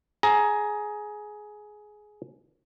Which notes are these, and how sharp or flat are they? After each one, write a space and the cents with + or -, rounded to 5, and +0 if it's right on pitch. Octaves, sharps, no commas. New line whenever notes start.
G#4 +15 A#5 +10